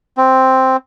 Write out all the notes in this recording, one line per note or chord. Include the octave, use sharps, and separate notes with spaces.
C4